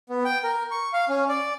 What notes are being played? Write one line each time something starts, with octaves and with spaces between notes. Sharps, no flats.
B3
G5
A#4
C#6
F5
C#4
D5